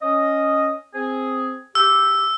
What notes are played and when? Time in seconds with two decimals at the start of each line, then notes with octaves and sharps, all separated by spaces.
0.02 C#4 D#5
0.94 C4 G#4
1.75 G4 E6